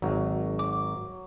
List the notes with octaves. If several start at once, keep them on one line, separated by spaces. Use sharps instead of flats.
G#1 F#3
D6